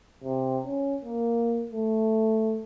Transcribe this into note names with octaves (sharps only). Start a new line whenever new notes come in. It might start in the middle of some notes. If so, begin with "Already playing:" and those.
C3
C#4
A#3
A3